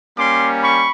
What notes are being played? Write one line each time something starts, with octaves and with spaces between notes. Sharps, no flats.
G3 A#3 C#4 C6 D6
B5 C#6